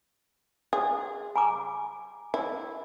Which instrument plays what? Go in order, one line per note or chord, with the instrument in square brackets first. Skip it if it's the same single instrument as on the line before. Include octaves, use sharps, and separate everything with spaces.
[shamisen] G#4
[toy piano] G#5 A#5 D6
[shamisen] E4